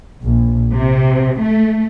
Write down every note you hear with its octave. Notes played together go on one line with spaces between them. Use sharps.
A#1
C3
A3